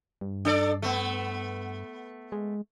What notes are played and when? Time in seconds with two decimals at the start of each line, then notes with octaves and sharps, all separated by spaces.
0.21 G2
0.45 D4 A4 D5
0.82 A3 B3
2.32 G#3